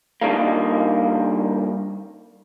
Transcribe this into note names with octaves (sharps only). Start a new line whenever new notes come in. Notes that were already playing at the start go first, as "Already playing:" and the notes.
G2 D#3 G3 A#3